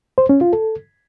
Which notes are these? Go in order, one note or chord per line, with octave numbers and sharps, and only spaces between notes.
C5
C#4
F4
A4